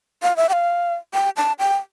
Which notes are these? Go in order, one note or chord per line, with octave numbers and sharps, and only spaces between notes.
F5
E5
G5
F5
G5
A5
G5